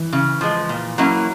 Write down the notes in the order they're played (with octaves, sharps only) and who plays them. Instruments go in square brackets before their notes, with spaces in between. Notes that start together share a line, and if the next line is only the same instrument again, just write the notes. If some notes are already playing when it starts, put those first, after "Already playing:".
Already playing: [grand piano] E3
[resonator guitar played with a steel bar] C#3
F3 G#3
A#2
F#3 A#3 C#4 E4